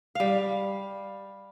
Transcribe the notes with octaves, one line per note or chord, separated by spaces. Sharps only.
G3 F5